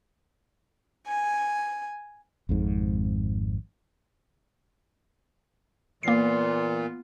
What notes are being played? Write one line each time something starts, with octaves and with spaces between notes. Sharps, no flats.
G#5
G#1 F2 G#2
A#2 E3 A#3 B3 F4 C7